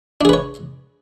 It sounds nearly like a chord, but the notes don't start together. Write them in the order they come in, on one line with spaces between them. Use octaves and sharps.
D4 G#4 B4 C#5